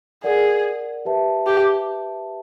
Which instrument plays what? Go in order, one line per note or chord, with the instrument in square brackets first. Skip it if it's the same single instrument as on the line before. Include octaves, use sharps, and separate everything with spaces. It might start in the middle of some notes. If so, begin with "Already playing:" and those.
[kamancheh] G#4 [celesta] A#4 D5 F#5
[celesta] G4 B4 E5 A5
[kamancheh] G4